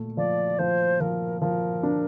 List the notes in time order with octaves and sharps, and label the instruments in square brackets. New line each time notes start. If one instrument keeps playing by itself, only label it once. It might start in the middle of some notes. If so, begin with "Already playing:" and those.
Already playing: [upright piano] A#2 A3
[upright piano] F3 [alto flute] D5
[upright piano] F3 [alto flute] C5
[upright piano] F3 [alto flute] A#4
[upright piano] F3 [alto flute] A#4
[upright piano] D4